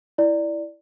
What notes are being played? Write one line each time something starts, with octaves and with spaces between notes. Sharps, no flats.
E4 D5